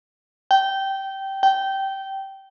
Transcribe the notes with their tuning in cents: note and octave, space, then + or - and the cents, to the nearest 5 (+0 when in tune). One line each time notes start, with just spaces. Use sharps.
G5 -15
G5 -15